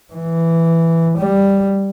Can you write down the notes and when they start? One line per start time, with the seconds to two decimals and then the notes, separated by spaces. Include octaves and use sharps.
0.13 E3
1.18 G3